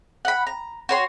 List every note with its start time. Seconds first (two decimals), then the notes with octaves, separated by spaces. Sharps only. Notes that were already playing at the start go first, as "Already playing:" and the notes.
0.25 F#5 B5
0.47 A#5
0.89 F#4 C#5 C6